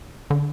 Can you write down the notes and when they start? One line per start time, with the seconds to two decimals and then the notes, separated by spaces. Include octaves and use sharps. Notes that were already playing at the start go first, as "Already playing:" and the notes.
0.30 D3